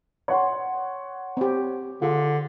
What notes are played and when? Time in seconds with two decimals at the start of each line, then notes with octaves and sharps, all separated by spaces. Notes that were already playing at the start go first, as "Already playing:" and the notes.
0.28 C#5 F#5 C6
1.37 C4 G4
2.02 D3 F4 G#4